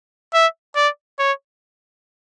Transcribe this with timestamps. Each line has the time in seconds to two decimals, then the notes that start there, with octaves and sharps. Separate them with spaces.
0.34 E5
0.76 D5
1.19 C#5